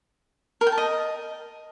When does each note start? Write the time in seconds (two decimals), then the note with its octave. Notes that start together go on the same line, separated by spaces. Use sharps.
0.61 A#4
0.67 G5
0.72 A5
0.77 D#5